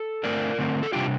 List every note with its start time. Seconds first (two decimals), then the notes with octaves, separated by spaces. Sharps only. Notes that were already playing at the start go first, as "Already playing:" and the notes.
Already playing: A4
0.23 D3 A3 C4 A#4 D5
0.58 D3 A3 C4
0.83 A4
0.92 C3 G3 D4 F4 G4